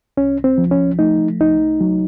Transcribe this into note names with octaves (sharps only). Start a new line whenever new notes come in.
C2 C#4
C4
F3
C#4
A3 D#4
C2 D#4
F#3